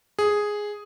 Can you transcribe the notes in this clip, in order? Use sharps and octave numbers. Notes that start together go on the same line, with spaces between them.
G#4